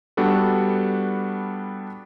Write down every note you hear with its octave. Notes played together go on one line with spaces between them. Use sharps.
G3 B3 D4 F#4 A4